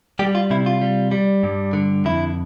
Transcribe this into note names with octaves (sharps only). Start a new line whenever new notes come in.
G3 G4
F4
C3 E4
F4
G3
G3
G2
D3
F2 E4